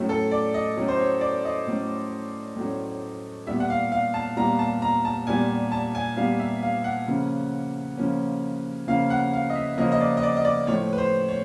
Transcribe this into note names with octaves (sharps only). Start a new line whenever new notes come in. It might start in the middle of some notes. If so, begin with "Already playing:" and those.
Already playing: A2 F#3 A3 C#4
A4
D5
D#5
A2 F#3 A3 C#4
C5
C#5
D5
D#5
A2 F#3 A3 C#4
A2 F#3 A3 C#4
A#2 G3 B3 E5
F#5
F5
F5
A5
A#2 G3 B3 A#5
A5
A#5
A5
A#2 G3 B3 G#5
A5
G#5
A#2 G3 B3 F5
E5
F5
F#5
C#3 F3 A#3 C#4
C#3 F3 A#3 C#4
C#3 F3 A#3 C#4 F5
F#5
F5
D#5
E5
C#3 F3 A#3 C#4 D#5
D#5
D5
D#5
D5
D#5
D5
A2 F3 A3 C#5
B4
C5
C#5